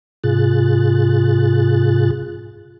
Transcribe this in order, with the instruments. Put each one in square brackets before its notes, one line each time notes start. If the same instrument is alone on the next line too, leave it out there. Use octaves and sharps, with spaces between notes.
[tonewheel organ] G#2 C3 F4 G#4 F#6 A6